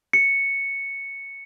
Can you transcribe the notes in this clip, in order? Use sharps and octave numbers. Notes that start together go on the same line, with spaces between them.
C#7